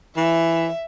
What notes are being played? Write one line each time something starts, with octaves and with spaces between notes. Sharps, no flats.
E3 E5